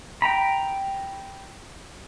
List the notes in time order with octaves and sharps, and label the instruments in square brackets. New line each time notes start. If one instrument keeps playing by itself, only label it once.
[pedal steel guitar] G5 A#5 B5